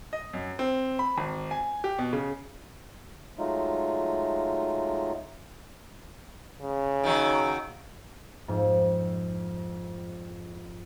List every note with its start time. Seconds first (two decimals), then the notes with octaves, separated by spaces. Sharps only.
0.13 D#5
0.33 F#2
0.59 C4
0.99 B5
1.18 G#1
1.51 G#5
1.84 G4
1.99 B2
2.13 C#3
3.38 F#3 G#3 A3 D#4 F4
6.61 C#3
7.03 D#3 F#3
8.48 F2 G#2